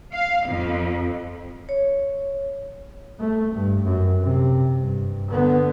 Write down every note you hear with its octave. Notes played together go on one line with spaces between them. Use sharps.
F5
F2
C#5
A3
G2
F#2
C3
G2
D3 B3